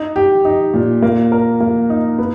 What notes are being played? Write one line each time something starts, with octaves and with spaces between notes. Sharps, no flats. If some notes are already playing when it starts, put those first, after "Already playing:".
Already playing: D#4
G4
D#4
A#2
A#3
A#4
A#3
D#4
B3